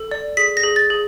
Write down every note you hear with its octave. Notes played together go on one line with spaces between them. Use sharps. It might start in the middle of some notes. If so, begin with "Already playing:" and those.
Already playing: A4
D5
G#4 B6
A#6
G#4
A6
G#4